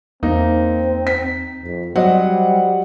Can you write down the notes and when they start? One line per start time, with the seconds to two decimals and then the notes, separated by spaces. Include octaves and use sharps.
0.23 E2 A#3 C4 D#4
1.07 B6
1.65 F2
1.96 F#3 G3 C5 D5 D#5 F#5